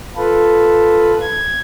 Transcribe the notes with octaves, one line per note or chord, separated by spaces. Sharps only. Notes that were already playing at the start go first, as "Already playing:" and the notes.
F4 A4 B4
G#6